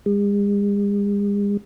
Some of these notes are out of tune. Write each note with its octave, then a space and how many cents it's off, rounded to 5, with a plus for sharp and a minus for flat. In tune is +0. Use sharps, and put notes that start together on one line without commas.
G#3 -45